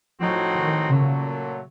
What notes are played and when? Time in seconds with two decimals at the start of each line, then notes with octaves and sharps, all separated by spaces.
0.20 A2 F3 F#3 C4 D#4 F#4
0.54 D#3
0.90 A#2 C#3 F#3 A3